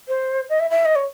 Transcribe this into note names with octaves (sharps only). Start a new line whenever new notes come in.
C5
D#5
E5
E5
D#5
C#5